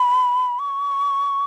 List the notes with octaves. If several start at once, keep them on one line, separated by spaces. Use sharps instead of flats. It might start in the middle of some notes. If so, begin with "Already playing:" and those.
Already playing: B5
C#6